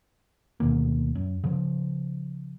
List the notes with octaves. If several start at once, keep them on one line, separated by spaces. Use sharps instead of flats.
D2 B2 D#3 A#3
F#2
C#3 F3